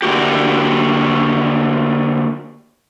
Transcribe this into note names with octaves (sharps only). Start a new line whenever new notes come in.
D3 A#3 F#4 G4